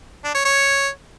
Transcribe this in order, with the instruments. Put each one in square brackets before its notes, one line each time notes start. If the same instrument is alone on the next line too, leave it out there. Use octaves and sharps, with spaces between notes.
[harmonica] D4
C#5
C#5